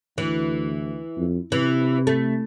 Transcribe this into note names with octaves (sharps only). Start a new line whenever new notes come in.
D2 E3
F2
C3 E3
A3